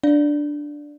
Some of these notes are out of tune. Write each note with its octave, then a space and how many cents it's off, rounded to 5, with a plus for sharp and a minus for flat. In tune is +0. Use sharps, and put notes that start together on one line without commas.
D4 +0 D5 +0 F5 +0